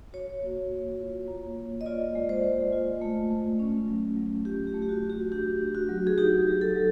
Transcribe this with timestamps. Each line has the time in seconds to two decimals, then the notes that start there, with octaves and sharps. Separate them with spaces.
0.13 F#4 C#5
0.42 A#3
0.71 A#3
0.99 F4
1.28 A#3
1.58 A#3
1.81 D#5
1.86 F4 D5
2.15 G#3
2.29 C5
2.43 G#3
2.72 F4
3.01 A3
3.30 A3
3.59 C#4
3.88 F#3
4.17 F#3
4.45 F4 G4
4.67 G4
4.74 A3
4.82 G4
4.89 F#4
5.02 A3
5.10 G4
5.32 D4 G4
5.60 F#4
5.75 F#4
5.89 F#3
6.07 G#4
6.18 D#4 G4
6.47 F#3
6.61 A4
6.76 F#3